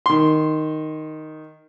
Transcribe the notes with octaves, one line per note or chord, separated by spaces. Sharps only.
D#3 C6